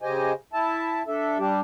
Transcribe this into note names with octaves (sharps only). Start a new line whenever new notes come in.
C#3 G4 C5 D#5 G#5
E4 E5 A5
D4 A4 E5
G3 D4 G4